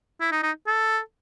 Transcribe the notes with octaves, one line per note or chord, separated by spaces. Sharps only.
E4
D#4
D#4
A4